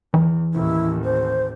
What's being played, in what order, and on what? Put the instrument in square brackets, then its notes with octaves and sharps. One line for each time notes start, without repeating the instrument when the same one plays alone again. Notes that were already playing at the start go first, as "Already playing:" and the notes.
[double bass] E2 [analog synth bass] E3
[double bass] A1 D#2 [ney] E4
[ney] C5